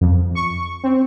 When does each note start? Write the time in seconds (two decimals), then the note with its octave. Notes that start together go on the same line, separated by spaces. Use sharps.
0.01 F2
0.35 C#6
0.84 C4